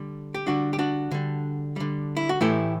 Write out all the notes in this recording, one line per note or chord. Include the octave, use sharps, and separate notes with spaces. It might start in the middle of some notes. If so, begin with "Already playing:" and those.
Already playing: D3 G3
G4
D3 G3 D4 F#4
G4
D4 F#4
D3 G3
D3 G3
E4
F#4
A2 E3 A3 E4 G4